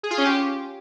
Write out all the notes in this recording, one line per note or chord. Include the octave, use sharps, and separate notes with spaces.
G#4
F4
C#4
G4